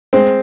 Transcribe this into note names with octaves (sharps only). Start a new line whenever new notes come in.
G#3 C4